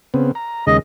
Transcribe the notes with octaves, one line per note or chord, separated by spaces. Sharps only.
C#3 B3 C4
A#5
D#2 C#3 G#3 D#5